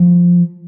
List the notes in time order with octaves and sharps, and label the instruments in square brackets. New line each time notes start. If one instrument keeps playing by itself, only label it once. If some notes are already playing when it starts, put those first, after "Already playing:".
Already playing: [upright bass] F3